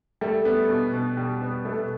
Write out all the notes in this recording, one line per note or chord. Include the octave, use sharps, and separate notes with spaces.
G3 A3 A4
B3
B2
B2
G3
B3
B2 A3 A4